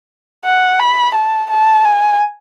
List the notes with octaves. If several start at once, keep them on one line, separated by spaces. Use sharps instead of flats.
F#5
B5
A5
A5
G#5